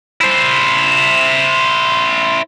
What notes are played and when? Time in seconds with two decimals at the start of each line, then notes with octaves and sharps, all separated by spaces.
0.21 E4 C5